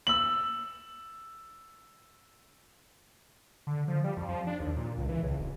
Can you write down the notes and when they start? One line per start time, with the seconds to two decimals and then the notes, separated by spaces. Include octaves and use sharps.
0.07 E6 F#7
3.67 D3
3.88 F3
4.04 G3
4.17 F2
4.29 F3
4.47 D4
4.60 D#2
4.77 A#2
4.98 C#2
5.09 E3
5.23 C#2
5.40 D1